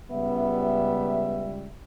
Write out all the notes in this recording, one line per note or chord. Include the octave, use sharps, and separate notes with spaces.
C#2 G3 B3 E5